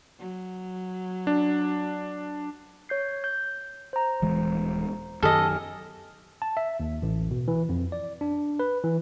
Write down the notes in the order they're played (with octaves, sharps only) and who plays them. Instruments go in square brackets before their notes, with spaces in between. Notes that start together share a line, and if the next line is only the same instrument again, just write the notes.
[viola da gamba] F#3
[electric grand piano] D4
[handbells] C#5 G6 C7
G6
C5 A#5
[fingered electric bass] D#1 E3 G#3
[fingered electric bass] F#2 D#3 [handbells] G4 G#5 F6 [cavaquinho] A4 D#5
[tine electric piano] A5
E5
D#2
A1
B2
E3
F2
D5
D4
B4
E3